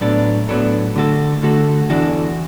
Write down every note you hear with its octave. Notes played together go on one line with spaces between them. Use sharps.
A2 F#3 B3 D4 A4
A2 F#3 B3 D4 A4
D3 A3 F#4 A4
D3 A3 F#4 A4
E2 E3 D4 F#4 A4